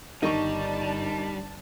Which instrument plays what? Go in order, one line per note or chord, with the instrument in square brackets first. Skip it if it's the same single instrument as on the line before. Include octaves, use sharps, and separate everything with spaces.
[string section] G1 D4 A5 [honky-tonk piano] D#3 C#6 [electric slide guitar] G3 [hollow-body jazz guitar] D#4